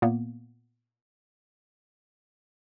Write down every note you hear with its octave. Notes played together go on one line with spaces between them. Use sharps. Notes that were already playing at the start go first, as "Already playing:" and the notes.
A#2 A#3 B3